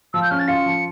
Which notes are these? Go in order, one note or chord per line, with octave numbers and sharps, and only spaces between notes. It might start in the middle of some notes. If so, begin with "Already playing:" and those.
F3 E6
G6
C#4 F6
A6
F4 C#7
F3